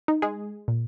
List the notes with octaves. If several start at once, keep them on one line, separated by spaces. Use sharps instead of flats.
D#4
G#3 G#4
A#2